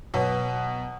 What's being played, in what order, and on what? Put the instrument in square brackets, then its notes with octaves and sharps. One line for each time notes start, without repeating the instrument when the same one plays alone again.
[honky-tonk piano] B2 F#3 B3